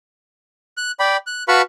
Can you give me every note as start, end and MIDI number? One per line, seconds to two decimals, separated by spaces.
0.77 0.91 90
1.00 1.17 74
1.00 1.17 79
1.00 1.17 83
1.27 1.43 90
1.48 1.62 66
1.48 1.62 71
1.48 1.62 77
1.48 1.62 81
1.48 1.62 83
1.48 1.62 85